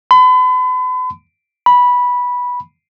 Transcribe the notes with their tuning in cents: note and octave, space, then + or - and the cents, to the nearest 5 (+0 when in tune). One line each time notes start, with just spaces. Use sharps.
B5 +40
B5 -10